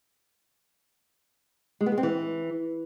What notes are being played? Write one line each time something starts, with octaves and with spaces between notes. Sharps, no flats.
G#3
B3
G#3
C4
E3